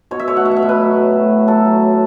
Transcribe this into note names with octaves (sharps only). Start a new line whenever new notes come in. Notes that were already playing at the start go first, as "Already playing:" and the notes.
B2 C#5
E5
A3 C#5
F#5
B2 E5
F#5
E5
B2
B4
F#3
A2
A2
A2
F#3 A4
F#3
A2